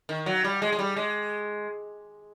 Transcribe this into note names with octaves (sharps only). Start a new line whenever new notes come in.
D#3
F#3
G3
G#3
G#3
G3
G#3